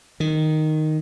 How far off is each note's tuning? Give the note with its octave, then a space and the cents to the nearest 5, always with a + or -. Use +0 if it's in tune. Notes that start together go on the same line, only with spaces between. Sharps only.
D#3 -5